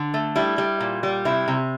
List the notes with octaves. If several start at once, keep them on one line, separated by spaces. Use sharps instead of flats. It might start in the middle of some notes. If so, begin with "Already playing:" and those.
Already playing: D3
A3
G3 E4
G3
A#2
G3
C3 E4
C3